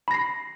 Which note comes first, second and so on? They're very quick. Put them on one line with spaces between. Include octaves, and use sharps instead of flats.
B5 A#6 C7